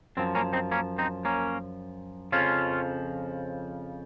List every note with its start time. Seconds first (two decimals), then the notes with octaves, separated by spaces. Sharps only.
0.17 F#2 F3 C4
0.35 A#3 C#4
0.53 C4 D#4
0.72 A#3 C#4
0.98 C4 D#4
1.25 A#3 C#4
2.32 F2 C#3 F3 C#4 F4